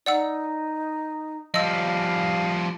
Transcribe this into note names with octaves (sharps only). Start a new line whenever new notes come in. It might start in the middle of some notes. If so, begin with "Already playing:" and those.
D#4 D5 F#5 E6
F3 G3 D#5 F5 E6